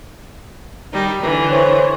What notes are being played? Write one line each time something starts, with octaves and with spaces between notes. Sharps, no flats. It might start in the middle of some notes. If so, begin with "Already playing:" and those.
D#3 G3 D#4
D3 E3
C5 C#5